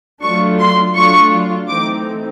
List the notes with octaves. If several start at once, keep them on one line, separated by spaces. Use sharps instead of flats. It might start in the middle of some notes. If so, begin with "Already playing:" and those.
F#3 A3 D4 F4 C#6
C6
F#3 A3 D4 F4 C#6
E3 A3 C4 D#4 D6